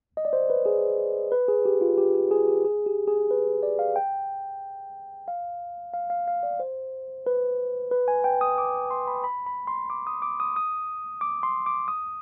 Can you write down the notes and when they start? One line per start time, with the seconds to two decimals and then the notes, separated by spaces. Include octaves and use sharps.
0.17 D#5
0.25 D5
0.33 C5
0.50 B4
0.66 G#4
1.32 B4
1.48 G#4
1.65 G4
1.81 F4
1.98 G4
2.15 G4
2.31 G#4
2.48 G4
2.65 G#4
2.86 G4
3.07 G#4
3.31 B4
3.63 D5
3.79 F5
3.96 G5
5.28 F5
5.94 F5
6.10 F5
6.28 F5
6.43 D5
6.60 C5
7.27 B4
7.91 B4
8.08 G#5
8.24 G5
8.41 D#6
8.58 D6
8.91 C6
9.07 B5
9.24 B5
9.46 B5
9.67 C6
9.90 D6
10.07 D#6
10.22 D6
10.40 D#6
10.56 D#6
11.21 D6
11.43 C6
11.66 D6
11.88 D#6